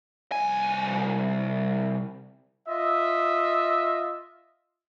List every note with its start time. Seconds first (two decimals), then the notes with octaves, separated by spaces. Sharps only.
0.32 C2 G#5
2.68 F4 D#5 E5